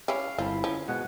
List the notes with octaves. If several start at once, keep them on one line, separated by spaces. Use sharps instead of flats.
C#4 E4 G4 F5
G1 C4 E4 F4 A5
F3 C#4
B2 G#3 F#5